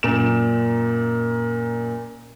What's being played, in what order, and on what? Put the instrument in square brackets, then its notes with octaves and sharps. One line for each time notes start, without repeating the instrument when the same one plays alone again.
[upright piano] F#2 A#2 E7